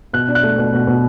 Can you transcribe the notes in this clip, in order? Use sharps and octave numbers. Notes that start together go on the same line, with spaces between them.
B2 F#6
D4
F#6
A3
B2
B2
B2